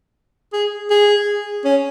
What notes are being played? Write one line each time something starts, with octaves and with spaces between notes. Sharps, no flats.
G#4
G#4
C#4